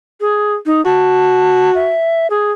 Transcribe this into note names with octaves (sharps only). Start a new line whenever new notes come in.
G#4
D#4
F#4 A5
E5
G#4